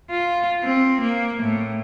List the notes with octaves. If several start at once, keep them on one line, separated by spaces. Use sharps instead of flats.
F4
C4
A#3
A2